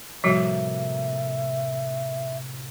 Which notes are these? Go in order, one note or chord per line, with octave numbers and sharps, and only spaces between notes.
A2 C3 F3 G3 A#3 F#4 E5